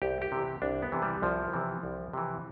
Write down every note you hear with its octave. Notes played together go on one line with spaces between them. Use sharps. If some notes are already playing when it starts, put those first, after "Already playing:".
C2 G4
G4
C3 E3
C2 D4
B3
C3 E3
G3
C2 F3
C3 E3
C2
C3 E3